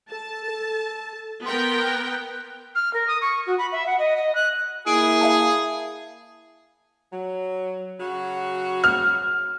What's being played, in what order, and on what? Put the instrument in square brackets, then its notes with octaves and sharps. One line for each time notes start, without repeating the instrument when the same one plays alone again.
[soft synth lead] A4 [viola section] A5
[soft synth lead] A4
[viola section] B3 A#4 G5 [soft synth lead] C6
[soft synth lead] F#6
[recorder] F6
A#4
D#6
C#6
F#4
B5
E5
F#5
D#5
D#5
F#6
[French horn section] A#3 E4 [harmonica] G#4 [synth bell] D7
[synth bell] E5 F5 A5
[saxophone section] F#3
C#3 F#3 F#4
[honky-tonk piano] F6